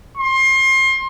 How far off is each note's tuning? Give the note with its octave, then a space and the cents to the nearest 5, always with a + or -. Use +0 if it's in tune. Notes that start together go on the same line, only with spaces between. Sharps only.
C6 +30